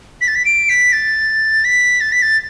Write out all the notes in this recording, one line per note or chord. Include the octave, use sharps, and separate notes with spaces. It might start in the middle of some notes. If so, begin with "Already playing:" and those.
B6
A6
B6
D7
B6
A6
B6
A6
B6
A6